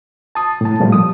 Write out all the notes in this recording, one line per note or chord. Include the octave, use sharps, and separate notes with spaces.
A5 D#6
A2 A5
A#2 F3 G3 A3
D#6